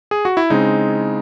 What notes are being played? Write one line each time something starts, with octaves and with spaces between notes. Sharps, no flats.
G#4
F#4
E4
C#3 G#3 C4 D#4